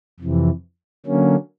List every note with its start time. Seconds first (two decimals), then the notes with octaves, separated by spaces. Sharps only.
0.20 F2 C3 E3
1.06 D3 F#3 A#3 C#4